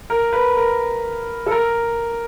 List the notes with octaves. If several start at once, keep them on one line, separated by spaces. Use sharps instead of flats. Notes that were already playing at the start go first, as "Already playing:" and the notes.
A#4
B4
A#4
A4
A#4